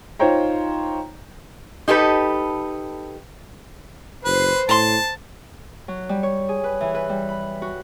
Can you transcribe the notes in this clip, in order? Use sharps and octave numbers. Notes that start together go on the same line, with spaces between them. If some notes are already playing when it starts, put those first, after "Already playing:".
D#4 F4 C5 C#5 G5 A#5
D#4 G4 A4 B4
F#1 B4 C5
A2 A5 A#5 C6
F#3
G3
C#5
G#4
B4
E3
B4
G3
B5
F#4